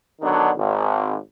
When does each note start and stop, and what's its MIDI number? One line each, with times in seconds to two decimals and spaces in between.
0.21 0.51 47
0.21 0.51 50
0.21 0.51 51
0.21 0.51 54
0.21 0.51 62
0.57 1.14 32